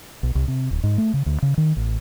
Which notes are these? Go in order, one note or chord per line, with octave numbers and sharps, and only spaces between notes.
B1
C2
C3
D1
G#2
A3
C#3
D2
C#3
D#3
A1